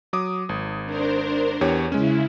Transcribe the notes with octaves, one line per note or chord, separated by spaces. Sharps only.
F#3 D6 D#6
G#1
D4 A#4 C5
E2 G4 C#5
C#3 G#3 C#4 E4